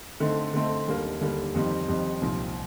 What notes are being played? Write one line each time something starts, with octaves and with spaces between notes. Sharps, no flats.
D3 A3 C4 D#4
D3 A3 C4 D#4
D#2 D3 G3 A#3
D#2 D3 G3 A#3
F2 D#3 G3 C4
F2 D#3 G3 C4
C2 A#2 F3 C4